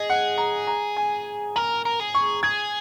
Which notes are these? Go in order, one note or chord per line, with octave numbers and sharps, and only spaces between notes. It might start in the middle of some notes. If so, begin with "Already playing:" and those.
Already playing: G#4 D#5
F#5
A#5
A#5
G#5
A#4 A#5
A#4
G#4
C#6
G#4 G#6